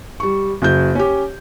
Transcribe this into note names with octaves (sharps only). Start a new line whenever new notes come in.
G3 C#6
F#1 F#4 G6
C#4 G4